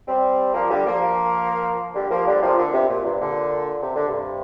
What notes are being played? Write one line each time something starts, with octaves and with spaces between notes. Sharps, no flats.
G3 C4
F3 A#3
D3 G3
F3 A#3
D3 G3
F3 A#3
D3 G3
C3 F3
A#2 D3
G2 C3
A#2
G2 C3
A#2 D3
C3
D3
G2 C3